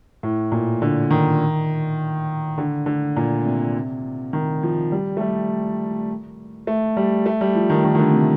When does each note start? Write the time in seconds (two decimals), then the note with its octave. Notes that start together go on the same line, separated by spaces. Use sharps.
0.23 A2
0.52 A#2
0.82 D3
1.11 D#3
2.58 D3
2.86 D3
3.17 A#2
3.46 C3
4.33 D#3
4.63 F3
4.92 G3
5.17 A3
5.21 G3
6.67 A3
6.97 G3
7.26 A3
7.41 G3
7.55 F3
7.70 D#3
7.84 D#3
7.95 D#3
7.99 D3
8.13 C3